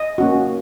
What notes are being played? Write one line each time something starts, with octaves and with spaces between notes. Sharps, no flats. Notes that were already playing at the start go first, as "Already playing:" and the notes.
Already playing: D#5
A#3 C#4 F#4